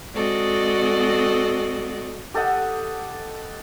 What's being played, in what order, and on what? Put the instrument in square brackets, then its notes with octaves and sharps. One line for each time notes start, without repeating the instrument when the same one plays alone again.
[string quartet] G#3 C4 F#4 A4 D5 D#5
[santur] G4 A4 D#5 F#5